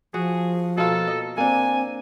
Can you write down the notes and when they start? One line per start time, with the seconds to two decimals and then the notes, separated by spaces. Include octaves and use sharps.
0.14 F3 F#4 G#4
0.77 B2 A#3 F4 A4
1.07 D#5
1.38 A#3 C4 D4 G#5